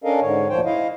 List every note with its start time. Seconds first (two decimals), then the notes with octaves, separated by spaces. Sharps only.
0.04 C#4 D4 A4 A#4 D#5 F5
0.21 G#2 D3 C#5
0.49 D2 A#2 F3 C5 C#5 G5
0.65 E4 D#5 F5